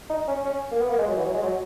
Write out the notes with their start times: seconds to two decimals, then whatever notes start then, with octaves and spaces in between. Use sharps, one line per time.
0.10 D#4
0.28 C#4
0.45 C#4
0.72 A#3
0.81 B3
0.90 A#3
0.98 G#3
1.08 F#3
1.17 E3
1.25 F#3
1.34 G#3
1.43 F#3